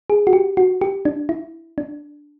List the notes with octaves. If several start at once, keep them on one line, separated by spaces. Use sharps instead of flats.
G#4
F#4
G4
F#4
G4
D4
E4
D4